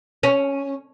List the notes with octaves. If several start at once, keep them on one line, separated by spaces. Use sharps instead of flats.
C#4